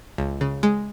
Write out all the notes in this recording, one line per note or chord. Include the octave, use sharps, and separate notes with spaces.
C#2
C#3
G#3